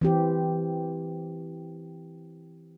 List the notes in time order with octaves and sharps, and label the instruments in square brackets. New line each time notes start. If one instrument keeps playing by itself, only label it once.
[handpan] E3 C4 G4